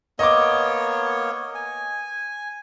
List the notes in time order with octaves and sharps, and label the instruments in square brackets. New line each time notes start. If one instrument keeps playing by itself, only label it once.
[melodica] A#3 B3 C#5 [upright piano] D#5 D6
[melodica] G#5